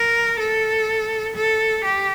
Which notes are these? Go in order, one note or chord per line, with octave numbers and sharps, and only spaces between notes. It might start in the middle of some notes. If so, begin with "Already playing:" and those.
Already playing: A#4
A4
A4
G4